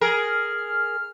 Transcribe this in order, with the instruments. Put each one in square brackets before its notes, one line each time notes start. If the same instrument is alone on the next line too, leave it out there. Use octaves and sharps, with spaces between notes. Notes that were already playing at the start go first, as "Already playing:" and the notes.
[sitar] G#4 A#4 [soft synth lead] F6